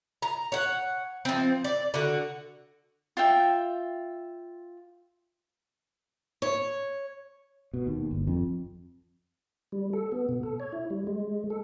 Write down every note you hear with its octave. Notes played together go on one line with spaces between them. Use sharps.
A#5
C#5 F#5
F3 C4
D5
D3 F#4
F4 E5 G5
C#5
B2
D#2
G1
F2
G3
A4
B3
B2
A4
C#5
E4
G3
G#3
A4